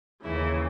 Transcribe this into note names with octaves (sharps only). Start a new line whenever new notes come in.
D#2 C#3 E3 E4